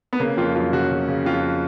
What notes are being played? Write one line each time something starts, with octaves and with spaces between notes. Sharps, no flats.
B3
C#3 A#3
F2 F4
F#3 F4
C#3 F#4
C#3
C#3
F2 F4